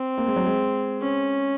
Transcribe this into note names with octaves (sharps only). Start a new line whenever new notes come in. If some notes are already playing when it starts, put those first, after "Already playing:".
Already playing: C4
A#3
G#3
F#3
G#3
C#4